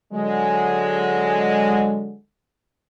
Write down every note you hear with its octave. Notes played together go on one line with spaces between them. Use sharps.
D3 F#3 G#3